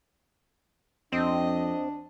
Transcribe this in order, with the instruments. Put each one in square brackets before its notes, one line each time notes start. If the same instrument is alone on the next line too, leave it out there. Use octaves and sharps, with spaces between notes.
[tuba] F2 [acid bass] C4 [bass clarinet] D4 [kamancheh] D#5